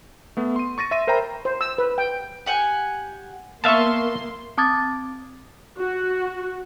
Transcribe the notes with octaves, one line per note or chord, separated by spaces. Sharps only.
A3 B3
C6 D#7
C#6 A6 A#6 D#7
E5 C6 A#6 D#7
A#4 C5 E5 G5 A#5 B5
C5
E6
B4
G5
G4 F#5 G#5
A#3 B3 E5 F5 A5 C6 C#6
C4 A5 D6 D#6 G#6 A6
F#4